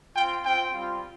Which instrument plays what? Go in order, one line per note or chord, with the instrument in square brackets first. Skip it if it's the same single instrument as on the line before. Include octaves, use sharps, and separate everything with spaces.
[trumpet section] C4 F4 G5
C4 F4 G5
G3 C4 F4